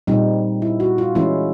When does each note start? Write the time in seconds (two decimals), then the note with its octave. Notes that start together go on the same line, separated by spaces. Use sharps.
0.07 A#2 G3 C4 D#4
0.62 E4
0.80 F#4
0.98 F4
1.15 E3 G#3 C#4 E4